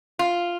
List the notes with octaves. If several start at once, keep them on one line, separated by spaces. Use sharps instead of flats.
F4